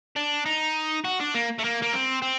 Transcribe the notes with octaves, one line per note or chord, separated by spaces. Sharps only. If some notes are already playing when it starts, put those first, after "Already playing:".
D4
D#4
F#4
D4
A#3
A3
A#3
A#3
C4
C4